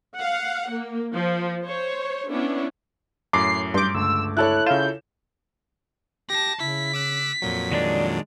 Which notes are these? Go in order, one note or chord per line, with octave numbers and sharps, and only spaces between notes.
F5 F#5
A#3
F3
C5 C#5
B3 C#4 D4 E4
F#2 A2 D6 C7
G2 C6 D6 G6
C#2 D3 A3 E6
E4 A4 C#5 F#6
C#3 F4 E5 G6 E7
G4 A5 A#6
C#3 E4 B6
D6 E6 F#6
F2 A#2 F#3
D#3 G#3 D4 D5